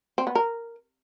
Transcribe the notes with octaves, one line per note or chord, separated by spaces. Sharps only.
C4
B3
A#4